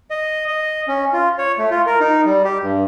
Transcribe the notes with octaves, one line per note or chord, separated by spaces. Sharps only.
D#5
D#5
C#4
F4
C#5
A3
F4
A#4
D#4
G3
G4
G2